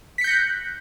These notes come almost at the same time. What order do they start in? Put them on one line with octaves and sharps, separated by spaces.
B6 C#7 G6 A#6 F#6